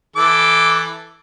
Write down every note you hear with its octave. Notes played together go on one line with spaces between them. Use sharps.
E3 A4 D6